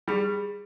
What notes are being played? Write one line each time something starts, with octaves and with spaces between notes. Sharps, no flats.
G3 G#4